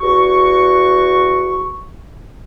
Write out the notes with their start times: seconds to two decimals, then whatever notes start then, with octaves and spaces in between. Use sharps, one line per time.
0.01 E2 F#4 C#6